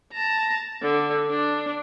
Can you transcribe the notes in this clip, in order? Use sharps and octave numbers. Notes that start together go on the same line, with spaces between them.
A5 A#5
D3
D4